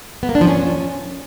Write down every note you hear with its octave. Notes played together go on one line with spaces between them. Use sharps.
B3
A#3
D4
F3
C#4